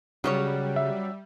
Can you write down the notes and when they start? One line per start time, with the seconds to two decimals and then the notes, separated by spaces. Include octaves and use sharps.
0.24 C#3 F#3 G3 C#4 C#5
0.76 E5